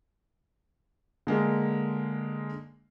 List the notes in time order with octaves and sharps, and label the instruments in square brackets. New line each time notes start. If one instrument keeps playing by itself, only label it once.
[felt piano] D3 G#3 A#3